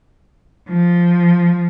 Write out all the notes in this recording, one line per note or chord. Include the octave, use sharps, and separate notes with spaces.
F3